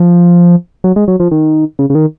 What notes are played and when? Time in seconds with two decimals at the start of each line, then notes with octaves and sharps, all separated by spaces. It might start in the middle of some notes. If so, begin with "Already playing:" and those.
Already playing: F3
0.84 F#3
0.96 G#3
1.08 F#3
1.20 F3
1.31 D#3
1.79 C#3
1.90 C#3
1.95 D#3